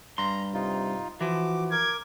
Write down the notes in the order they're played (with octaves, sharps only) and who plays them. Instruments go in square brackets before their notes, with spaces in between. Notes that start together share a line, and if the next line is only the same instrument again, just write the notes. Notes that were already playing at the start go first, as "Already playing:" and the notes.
[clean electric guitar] G2 C6 [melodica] A#5
[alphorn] C3 [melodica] D#4 F4
[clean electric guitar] E3 F3 [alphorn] F#4 [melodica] D6
[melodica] A#4 D6 [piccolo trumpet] G#6